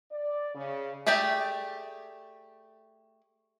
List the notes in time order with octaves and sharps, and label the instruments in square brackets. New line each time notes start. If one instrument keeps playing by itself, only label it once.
[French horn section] D5
C#3
[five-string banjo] A3 G4 G#4 D5 E5